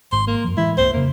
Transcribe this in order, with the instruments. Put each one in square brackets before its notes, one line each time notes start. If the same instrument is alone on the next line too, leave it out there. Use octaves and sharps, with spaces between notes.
[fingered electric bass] G#1 G#2 [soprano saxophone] C6
[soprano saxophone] A#3
[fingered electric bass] F#2 F3
[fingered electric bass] A2 E3 G#3 [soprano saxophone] E4
[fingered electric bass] C2 G2 A#3 [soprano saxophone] C5
[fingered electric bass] F2 C#3 [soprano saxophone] A#3